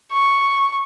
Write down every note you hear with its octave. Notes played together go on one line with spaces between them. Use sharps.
C#6